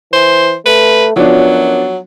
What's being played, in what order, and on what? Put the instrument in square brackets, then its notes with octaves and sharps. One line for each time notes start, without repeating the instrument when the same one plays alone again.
[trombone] E3 [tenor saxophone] C5
[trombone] A3 [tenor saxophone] B4
[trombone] F#2 [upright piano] F3 B3 D4 [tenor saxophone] F#3